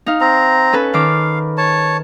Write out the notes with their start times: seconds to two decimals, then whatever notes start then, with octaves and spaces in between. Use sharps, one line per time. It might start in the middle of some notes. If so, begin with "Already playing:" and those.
0.06 D#4 F5
0.21 C4 A#5
0.73 C#4 A4 B4
0.94 D#3 F5 D6
1.57 C#5 A5